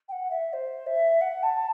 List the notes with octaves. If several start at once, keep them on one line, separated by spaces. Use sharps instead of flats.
G5
F#5
E5
C5
E5
F#5
A5